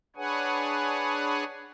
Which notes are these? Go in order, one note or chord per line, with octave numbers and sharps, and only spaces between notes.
D4 G#4 B4 C#5 F#5 G#5